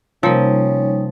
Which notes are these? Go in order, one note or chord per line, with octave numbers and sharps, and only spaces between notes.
C3 F3 G3 A#3 C#4 D#4 A#4